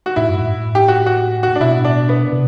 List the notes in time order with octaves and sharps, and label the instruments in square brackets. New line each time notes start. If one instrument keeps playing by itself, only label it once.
[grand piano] F#4
[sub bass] A2 [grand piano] E4
[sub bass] G2
A2
[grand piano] G4
F#4
F#4
F#4
D4
[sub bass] B2 [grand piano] E4
[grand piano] D4
B3
[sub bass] C3